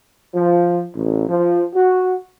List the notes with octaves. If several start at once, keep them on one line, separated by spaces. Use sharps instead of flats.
F3
A1
F3
F#4